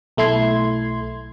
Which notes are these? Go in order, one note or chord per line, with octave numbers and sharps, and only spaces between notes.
B1 A3 E4 C6 G#6